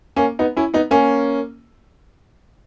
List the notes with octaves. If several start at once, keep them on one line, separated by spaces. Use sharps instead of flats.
A#3 C#4
B3 D#4
C#4 E4
B3 D#4
A#3 C#4